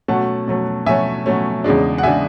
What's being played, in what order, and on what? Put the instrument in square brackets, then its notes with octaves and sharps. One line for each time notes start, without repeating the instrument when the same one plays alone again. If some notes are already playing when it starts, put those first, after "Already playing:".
[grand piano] B2 F#3 A3 C#4 F#5 A5
B2 F#3 A3 C#4
B2 F#3 A3 C#4 E5 G#5
B2 F#3 A3 C#4
E2 C#3 G#3 D4
F#5
C#3 G#3 D4 E5 G#5